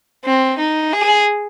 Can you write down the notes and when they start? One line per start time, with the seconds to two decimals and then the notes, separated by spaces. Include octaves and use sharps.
0.25 C4
0.59 D#4
0.92 G#4